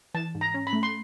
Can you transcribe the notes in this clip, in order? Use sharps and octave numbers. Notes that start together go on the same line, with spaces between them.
E3 A5
G#2
A#5
C#4
B5
A3
C6